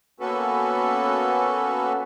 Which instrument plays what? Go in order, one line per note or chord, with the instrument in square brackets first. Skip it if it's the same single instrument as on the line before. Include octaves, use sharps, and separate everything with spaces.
[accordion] A#3 B3 C#4 F#4 A4 B4